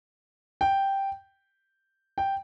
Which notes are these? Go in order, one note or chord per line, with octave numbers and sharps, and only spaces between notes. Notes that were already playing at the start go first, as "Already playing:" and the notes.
G5
G5